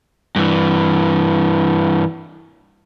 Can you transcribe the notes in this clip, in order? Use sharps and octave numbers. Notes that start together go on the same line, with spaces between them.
G2 E3